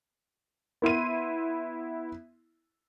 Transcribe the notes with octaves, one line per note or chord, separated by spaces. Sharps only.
B3 E4 C6 D#7